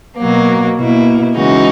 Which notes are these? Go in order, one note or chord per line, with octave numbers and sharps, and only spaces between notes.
B2 F#3 A#3
B2 A#3 E4
C#3 E3 G#3 D#4 F#4